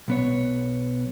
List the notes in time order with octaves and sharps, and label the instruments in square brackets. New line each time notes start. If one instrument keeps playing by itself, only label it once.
[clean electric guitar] B1 B3 C#5